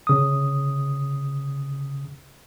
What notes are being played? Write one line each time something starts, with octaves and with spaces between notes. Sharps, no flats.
C#3 D#6